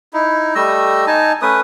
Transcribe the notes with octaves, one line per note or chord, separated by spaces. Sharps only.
D#4 E4
G3 A3 D#5 E6
D#4 G#5 A5
A3 C#4 B4 D#6